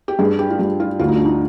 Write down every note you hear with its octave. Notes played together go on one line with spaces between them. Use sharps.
G4
G2 G#4
G4
F4
G2 G4
F4
D2 F4
D#4
D4
D#4